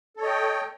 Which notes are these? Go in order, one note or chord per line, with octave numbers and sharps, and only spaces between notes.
A4 C#5 D#5 G5